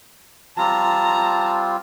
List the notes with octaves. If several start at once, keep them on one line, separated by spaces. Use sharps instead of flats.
G3 C4 F4 A5 A#5